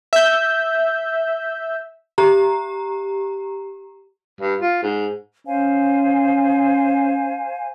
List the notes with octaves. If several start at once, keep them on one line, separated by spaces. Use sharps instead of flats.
E5 G6
G4 A#5
G2
F4
G#2
C#4 C5 F5 G#5